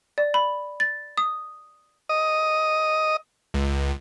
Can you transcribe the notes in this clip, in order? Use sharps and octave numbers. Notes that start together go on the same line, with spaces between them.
D5
B5
A6
D#6
D#5
C#2